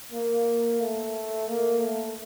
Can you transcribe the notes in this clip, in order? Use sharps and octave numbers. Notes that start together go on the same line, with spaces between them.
A#3
A3
A#3
A3